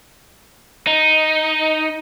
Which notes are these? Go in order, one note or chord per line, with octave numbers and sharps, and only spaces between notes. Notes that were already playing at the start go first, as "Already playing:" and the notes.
D#4